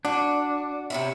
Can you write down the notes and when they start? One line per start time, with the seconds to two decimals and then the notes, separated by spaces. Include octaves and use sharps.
0.05 D4 F#4
0.90 C3 C#4 E4